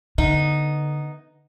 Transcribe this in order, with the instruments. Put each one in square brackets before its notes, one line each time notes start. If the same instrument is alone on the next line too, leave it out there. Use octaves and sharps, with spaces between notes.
[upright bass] D3 [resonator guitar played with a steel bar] B3 D#4